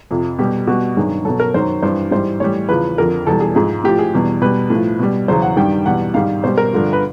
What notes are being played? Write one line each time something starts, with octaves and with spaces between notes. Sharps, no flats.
F2 C3 F3
B2 G3 G4
B2 G3 F#4
G2 D#3 F#3 G#4
B2 F#3 A4
A#4
F#2 D#3 F#3 C5
G2 E3 G3 C5
G#2 E3 G3 C5
A2 E3 G3 C#5
E2 C#3 F3 B4
F2 D3 F3 A#4
E2 B2 G3 A4
G#4
G#2 F3 G#4
A2 F3 G4
G#4
E2 B2 G3
B2 G3 B4
A2
F3
B2 G3
E2 C#3 F#3 C5
F#5
G2 D#3 G3 G5
E2 B2 G3 F#5
G#2 D#3 G3 F5
B2 G3 C5
A#4
G2 D3 F3
B4